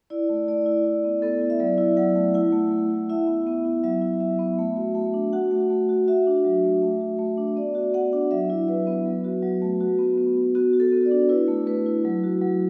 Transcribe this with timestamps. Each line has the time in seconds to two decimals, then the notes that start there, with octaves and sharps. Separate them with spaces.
0.10 E4 D5
0.29 A3
0.48 A3 D5
0.66 E4
0.85 E4 D5
1.04 B3
1.22 B3 A4
1.41 E4
1.50 E5
1.60 F#3 D5
1.78 E4
1.97 F#3 F#5
2.15 A3
2.34 E4 F#5
2.52 A3
2.71 A3
2.90 E4
3.10 E4 E5
3.27 B3
3.47 B3
3.65 E4
3.84 F#3 E5
4.02 E4
4.20 F#3 E5
4.39 B3
4.59 A3
4.76 F#4
4.95 A3
5.14 D4
5.33 F#4 F#5
5.51 A3
5.70 A3
5.89 F#4
6.08 F#4 E5
6.27 D4
6.45 F#3
6.64 A3
6.82 A3
7.00 F#4
7.19 A3
7.37 D4
7.56 B3 D5
7.75 F#4
7.93 B3 F#5
8.13 D4
8.31 F#3 E5
8.50 E4
8.68 F#3 B4
8.87 B3
9.06 F#3
9.24 F#4
9.43 F#3
9.62 A3
9.81 F#4
9.99 B3
10.18 B3
10.37 F#4
10.55 B3 F#4
10.73 F#4
10.80 A4
10.92 B3
11.05 D5
11.11 D4
11.29 E4 B4
11.48 A3
11.66 A3 B4
11.86 E4
12.05 F#3
12.24 F#4
12.41 F#3